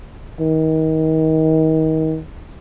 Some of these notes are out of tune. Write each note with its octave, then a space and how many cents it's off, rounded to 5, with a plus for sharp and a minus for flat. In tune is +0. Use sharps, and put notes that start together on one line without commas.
D#3 +30